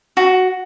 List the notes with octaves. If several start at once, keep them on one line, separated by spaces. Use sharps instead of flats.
F#4